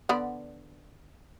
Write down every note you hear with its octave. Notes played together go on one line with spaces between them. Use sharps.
D3 B3 D5